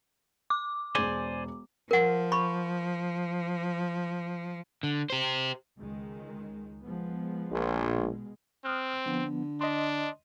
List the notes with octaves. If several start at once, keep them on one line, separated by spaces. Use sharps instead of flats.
D6
E1 G#4 C5 D5 G#5
F3 A#4 F#5
B5 C#6
D3
G4 C5
C#2 D#3 G#3
F3 G#3 B3
A#1
B2 G#3
C4 D#6 F6 F#6
D3 F3 B3
D4 D#5 C6